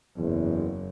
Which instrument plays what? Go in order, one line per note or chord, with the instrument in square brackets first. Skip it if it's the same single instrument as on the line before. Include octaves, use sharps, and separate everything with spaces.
[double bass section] F#1 [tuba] E2